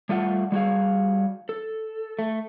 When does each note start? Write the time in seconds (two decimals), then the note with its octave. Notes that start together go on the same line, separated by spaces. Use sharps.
0.09 G3 A3 F4 F#5
0.52 G3 F#4 G#4 F5
1.49 A4
2.19 A3